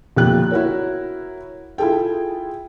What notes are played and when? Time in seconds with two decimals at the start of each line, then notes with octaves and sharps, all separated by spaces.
0.16 B1 F2 A#3 G4 G5 F#6
0.51 E4 F#4 A#4 C#5
1.78 E4 F4 G#4 A4 G5